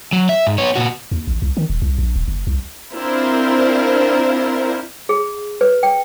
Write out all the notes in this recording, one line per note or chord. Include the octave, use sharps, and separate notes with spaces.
F#3
E5
G#2
B3 C#5
A#2 F#4
D#2
A1
C2
D#3
D#1
C2
A#1
D#1
F#1
C2
C4 D4 E4 F4 A#4 C5
G#4
B4
G5